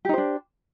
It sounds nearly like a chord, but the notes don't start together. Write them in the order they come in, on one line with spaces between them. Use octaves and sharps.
G4 D#4 C5 D4